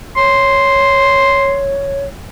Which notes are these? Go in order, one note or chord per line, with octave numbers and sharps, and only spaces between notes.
C#5 C6